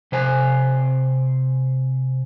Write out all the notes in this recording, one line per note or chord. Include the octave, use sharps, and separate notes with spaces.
C3 C5 G#5